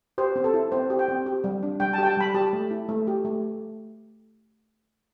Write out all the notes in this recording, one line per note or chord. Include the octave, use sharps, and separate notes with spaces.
G4 C5
C4
A4
E4
C4 C5
G4
G5
C4
G4
G3
D4
G3 G5
A5
G4 G5
A5
G3 B5
G4 A5
A3
E4
A3
G4
A3